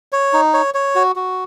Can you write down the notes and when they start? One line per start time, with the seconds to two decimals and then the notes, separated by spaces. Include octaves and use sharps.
0.12 C#5
0.33 D#4
0.54 C#5
0.74 C#5
0.95 F#4
1.16 F#4